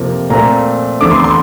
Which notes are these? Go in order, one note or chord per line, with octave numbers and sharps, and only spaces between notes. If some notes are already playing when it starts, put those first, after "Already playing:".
Already playing: F2 C3 F3 A#3
A#2 A3 C4 A#5
E2 D3 A3 D6
C6
C6